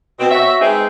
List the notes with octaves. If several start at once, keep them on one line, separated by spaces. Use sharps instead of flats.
B2 C4
F#4 C#5 E5
G#3 B3 C4 D#4 G#4